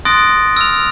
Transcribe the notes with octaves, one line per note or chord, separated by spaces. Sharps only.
C6 D#6 F#6 A6 A#6 D7
E6 F6 F7